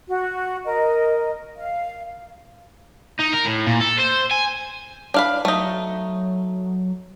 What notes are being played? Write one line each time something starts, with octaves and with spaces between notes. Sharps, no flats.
F#4
A#4 D#5
F5
D#4
A#4
A2
A#2
A4
C5
G#5
D4 F5 B5
F#3 A3 D#4